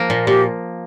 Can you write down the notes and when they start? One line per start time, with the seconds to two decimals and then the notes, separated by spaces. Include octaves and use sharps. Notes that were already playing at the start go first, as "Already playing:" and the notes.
Already playing: F3 A#3
0.10 A#2
0.27 A#2 G4